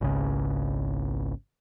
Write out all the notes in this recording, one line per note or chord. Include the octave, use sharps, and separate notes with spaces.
G#1 C#2 C#3